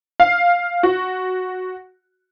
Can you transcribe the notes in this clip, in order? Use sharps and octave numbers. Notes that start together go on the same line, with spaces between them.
F5
F#4